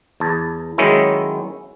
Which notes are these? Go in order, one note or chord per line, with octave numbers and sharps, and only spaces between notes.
E2 A5
D#3 F#3 G#3 C#4 D#4 E4